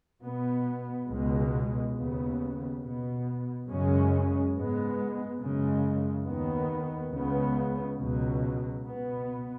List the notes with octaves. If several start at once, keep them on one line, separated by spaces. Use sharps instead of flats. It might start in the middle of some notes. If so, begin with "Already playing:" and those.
B2 B3
C#2 B2 G#3
D#2 C#3 B3
B2 B3
F#2 C#3 G#3 C#4
G#2 G#3 B3
F#2 C#3 G#3
D#2 D#3 B3
C#2 C#3 B3
C#2 B2 F#3
B2 B3